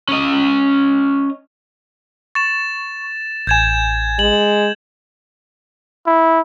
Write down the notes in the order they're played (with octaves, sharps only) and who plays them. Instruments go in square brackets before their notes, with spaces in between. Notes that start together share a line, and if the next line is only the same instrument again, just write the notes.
[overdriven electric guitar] C#4 D#5
[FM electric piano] C#6 [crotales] A6 E7
[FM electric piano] A1 G#5 [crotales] G6 G#6 E7
[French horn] G#3 [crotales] F#7
[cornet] E4